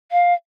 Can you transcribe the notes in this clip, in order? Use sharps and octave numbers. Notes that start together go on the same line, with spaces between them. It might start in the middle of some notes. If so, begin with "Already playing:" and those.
F5